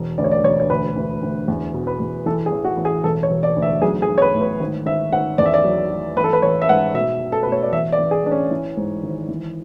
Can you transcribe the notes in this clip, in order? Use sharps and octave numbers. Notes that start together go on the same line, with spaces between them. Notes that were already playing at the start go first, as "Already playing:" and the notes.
Already playing: E1
D2 D5
C#5
D5
E1 C#5
C#5
D2 B4
D2
D2
E2
B2
B4
E2
E3 A4
G#4
A1
F#4
A1
G#4
E1 A4
C#5
E1
D5
D2
E5
B1 G#4
G#4
B1
C#5
B4
A2
B4
G#1
G#1 E5
G#1 F#5
E2 D5
E5
D5
F#3
F#3
A1 B4
A4
B4
A1 C#5
E5
G#2 F#5
B2 E5
B2
A4
B2 B4
C#5
D5
A1 E5
D5
A1
G#4
A1 D4
C#4
E3
G#2
G#1
E3